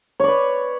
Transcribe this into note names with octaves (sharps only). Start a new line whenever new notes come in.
B4 C#5 D5